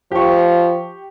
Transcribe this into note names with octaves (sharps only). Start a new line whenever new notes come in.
F3 G4 C#6